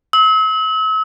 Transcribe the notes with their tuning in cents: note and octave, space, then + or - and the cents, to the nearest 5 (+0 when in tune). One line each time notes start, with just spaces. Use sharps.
E6 -40